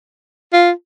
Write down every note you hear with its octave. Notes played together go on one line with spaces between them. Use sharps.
F4